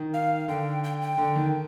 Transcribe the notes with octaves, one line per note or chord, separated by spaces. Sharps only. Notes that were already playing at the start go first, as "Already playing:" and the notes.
Already playing: D#3
F5
D3 G5
G5
G5
D3
D#3